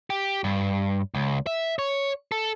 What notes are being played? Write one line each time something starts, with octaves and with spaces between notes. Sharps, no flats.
G4
G2
C#2
E5
C#5
A4